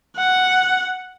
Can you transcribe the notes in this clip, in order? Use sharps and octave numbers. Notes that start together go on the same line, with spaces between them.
F#5